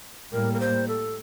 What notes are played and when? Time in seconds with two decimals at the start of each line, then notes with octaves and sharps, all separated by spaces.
0.32 A2 G3 A#3 A#4
0.53 A#4
0.60 C5
0.88 A4